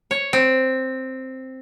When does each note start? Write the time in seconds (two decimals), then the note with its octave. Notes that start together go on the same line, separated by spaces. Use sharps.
0.11 C#5
0.33 C4